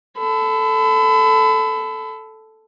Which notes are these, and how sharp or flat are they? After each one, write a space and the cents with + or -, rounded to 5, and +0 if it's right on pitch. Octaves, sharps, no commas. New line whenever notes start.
A4 +0 B5 +30